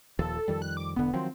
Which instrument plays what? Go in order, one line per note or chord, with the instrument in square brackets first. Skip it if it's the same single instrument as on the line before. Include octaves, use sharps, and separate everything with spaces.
[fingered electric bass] D#1 D#2 F3 [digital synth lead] A4
[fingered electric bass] F2 D#3 G3
[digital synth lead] F#6
D6
[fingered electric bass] E1 D3 [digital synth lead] B3
[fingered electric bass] D#3 F3 F#3 [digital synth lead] C4